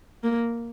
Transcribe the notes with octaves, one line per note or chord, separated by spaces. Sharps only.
A#3